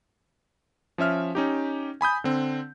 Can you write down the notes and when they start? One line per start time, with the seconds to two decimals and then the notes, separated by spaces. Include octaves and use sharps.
0.98 F3 C#4 E5 F6
1.35 C#4 D#4 G4
2.01 G#5 B5 D#6 G6
2.24 D3 C4